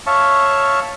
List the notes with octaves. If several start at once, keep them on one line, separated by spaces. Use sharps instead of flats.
C#5 E5 F5 A5 C#6